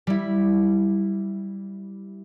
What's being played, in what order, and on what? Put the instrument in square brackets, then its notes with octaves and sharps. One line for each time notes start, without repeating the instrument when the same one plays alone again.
[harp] G3 E4